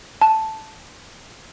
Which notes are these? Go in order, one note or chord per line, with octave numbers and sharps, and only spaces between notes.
A5